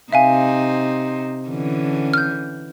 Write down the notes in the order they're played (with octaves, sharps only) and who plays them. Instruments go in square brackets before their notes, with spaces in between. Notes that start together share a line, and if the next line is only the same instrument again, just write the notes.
[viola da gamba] C3 D#4 C5 [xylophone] E5 F5 G#5
[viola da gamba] D3 E3 C#4
[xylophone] F6 G6